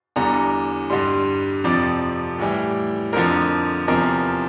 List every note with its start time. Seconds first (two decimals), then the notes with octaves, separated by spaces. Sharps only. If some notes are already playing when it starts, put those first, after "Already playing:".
0.16 E2 D3 G3 A#5
0.90 G2 D3 G3 C6
1.64 F2 C3 F3 D5
2.39 A2 E3 G3
3.13 F2 D3 F3 A#4
3.88 E2 C3 F3 A#4